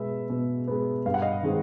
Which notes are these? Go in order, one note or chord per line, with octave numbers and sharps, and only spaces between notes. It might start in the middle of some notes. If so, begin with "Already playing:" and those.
Already playing: B2 G#3 B3 E5
B2
G#3 B3
G2 F5
F#5
D#5 F5
D#3 G#3 C4